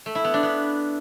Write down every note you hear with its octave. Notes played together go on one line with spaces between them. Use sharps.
A3
E4
B3
D4
B3